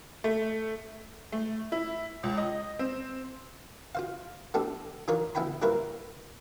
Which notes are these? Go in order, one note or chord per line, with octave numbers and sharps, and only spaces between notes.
A3
A3
E4
C#2
D#5
C4
F4 C5 F5
A3 B3 D4 G4 A4
E3 D#4 F4 A#4 C#5 D5
D2 B3 E4 G5 G#5 B5
G3 A#3 E4 A#4 B4 C#5